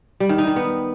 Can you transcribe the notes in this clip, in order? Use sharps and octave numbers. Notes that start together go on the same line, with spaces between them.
G3
D#3
D#4
D#3
B3